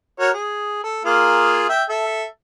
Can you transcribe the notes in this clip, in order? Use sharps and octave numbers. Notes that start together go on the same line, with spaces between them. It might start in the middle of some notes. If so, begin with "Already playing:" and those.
F#4 A#4 C#5
G#4
A4
A#3 F4 G#4
E5 G5
A4 E5